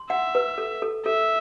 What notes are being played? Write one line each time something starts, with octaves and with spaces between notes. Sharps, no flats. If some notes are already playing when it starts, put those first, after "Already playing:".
Already playing: C6
E5 F#5
B4
A4
A4
A4 E5